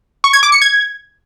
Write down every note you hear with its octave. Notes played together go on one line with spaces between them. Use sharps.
C#6
G#6
D6
C#7
G#6